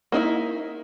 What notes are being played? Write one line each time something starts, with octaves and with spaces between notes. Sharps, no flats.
A#3 D#4 E4 E5